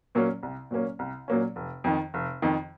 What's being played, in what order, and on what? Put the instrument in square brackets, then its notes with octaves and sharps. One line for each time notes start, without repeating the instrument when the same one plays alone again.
[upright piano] A#2 F#3 A#3 C#4
C2
A#2 F#3 A#3 C#4
C2
A#2 F#3 A#3 C#4
F1
F2 D#3
F1
F2 D#3